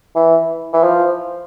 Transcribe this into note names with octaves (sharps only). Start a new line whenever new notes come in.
E3
E3
F3